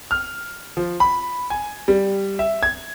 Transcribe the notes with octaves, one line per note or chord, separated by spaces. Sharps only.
F6
F3
B5
G#5
G3
E5
G#6